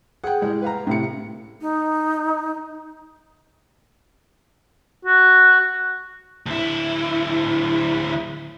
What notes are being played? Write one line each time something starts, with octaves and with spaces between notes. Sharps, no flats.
G#4 F#5 G5
A2 G3 G#3
B4 F5 A#5
A2 C3 E4 C#7
D#4
F#4
D2 E4